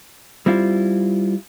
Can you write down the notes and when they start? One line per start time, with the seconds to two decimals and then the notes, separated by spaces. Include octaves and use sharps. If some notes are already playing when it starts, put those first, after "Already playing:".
0.46 G3 C4 E4 F4